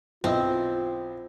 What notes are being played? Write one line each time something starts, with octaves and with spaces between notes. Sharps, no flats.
B1 C4 E4 F4 D#5